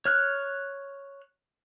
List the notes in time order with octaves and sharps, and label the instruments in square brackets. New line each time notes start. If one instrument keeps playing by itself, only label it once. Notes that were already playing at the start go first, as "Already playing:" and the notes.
[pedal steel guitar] C#5 F6 F#6